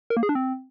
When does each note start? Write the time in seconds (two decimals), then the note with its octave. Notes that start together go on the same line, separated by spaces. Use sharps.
0.10 A#4
0.17 A#3
0.23 G#4
0.29 D4
0.35 C4